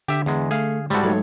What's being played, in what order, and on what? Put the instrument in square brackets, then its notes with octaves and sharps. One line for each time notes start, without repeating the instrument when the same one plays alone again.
[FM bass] D3 [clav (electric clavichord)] G4 E5
[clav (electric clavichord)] E2 G#3
[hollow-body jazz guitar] A3 [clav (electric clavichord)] G#4 F5
[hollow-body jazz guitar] G#2 [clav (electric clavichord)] G3 F#4 [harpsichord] C4 E4 A4
[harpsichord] B1 A2 C#5 [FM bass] F#3